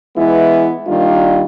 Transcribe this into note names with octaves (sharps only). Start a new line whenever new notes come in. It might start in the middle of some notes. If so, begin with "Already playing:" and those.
E3 G#3 B3 E4
D#3 G3 A#3 D4 F4